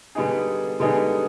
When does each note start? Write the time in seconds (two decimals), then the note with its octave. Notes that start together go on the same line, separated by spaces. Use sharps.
0.15 D3 G3 B3 D#4 G#4
0.80 D3 G3 B3 D#4 G#4